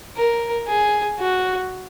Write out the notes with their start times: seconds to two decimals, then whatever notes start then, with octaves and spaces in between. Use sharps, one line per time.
0.16 A#4
0.67 G#4
1.19 F#4